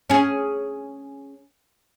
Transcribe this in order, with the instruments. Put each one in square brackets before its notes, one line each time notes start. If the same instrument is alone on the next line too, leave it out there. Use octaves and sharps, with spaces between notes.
[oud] C#4 G#4